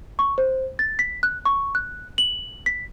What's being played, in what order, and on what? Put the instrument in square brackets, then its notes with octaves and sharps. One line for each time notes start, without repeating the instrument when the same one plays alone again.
[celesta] C#6
C5
A6
B6
F#6
C#6
F#6
F#7
B6